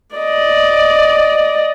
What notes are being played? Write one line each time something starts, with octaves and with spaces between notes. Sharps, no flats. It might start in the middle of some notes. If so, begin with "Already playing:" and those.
D5 D#5